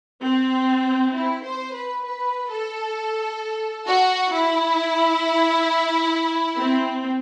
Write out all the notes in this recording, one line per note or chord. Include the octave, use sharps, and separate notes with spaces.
C4
E4
C5
B4
B4
A4
F#4
E4
C4